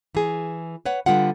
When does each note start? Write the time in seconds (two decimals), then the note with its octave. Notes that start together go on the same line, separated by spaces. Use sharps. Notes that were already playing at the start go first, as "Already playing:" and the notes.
0.15 E3 G#4
0.86 B4 C#5 F#5
1.06 D3 G3 B3 F4 F#5